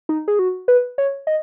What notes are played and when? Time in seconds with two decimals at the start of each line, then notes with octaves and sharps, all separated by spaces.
0.09 D#4
0.28 G#4
0.39 F#4
0.68 B4
0.98 C#5
1.27 D#5